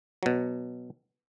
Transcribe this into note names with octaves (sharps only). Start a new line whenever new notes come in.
B2 F#3